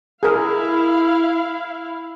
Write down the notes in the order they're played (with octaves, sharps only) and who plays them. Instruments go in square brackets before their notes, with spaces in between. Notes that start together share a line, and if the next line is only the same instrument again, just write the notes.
[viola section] E4 F5 [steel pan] G#4 A#4